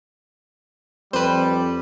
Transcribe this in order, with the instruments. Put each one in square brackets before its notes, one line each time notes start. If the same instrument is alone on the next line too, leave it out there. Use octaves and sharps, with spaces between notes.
[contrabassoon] F2 [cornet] G3 [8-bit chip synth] B4 C5